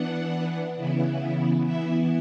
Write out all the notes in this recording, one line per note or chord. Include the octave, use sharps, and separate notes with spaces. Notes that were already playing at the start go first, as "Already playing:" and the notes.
Already playing: E3 B3 D4 F#5
C#3 E3 B3 E4
E3 B3 E4 E5